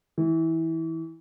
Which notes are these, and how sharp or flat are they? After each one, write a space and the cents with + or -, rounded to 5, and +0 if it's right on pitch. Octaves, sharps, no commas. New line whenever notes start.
E3 -20